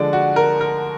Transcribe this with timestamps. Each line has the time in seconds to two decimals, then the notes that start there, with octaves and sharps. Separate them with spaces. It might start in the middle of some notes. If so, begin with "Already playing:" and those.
Already playing: D3 F3 G#3 D5
0.13 F#4
0.36 A#4
0.61 A#4